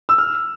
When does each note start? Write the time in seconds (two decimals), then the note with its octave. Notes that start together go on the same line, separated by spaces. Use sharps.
0.09 E6
0.18 F6